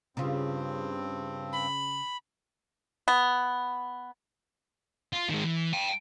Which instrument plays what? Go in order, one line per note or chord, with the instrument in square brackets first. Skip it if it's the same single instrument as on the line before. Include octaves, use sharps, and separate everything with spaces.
[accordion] G2 C4 [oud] C#3 F4
[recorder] B5
[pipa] B3
[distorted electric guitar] F4
D#3 G#3
E3
G5 A5